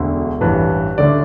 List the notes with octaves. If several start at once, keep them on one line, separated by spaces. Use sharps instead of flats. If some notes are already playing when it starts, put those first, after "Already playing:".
Already playing: E1 D2 D3
A1 G2 E3 B4
D2 D3 D5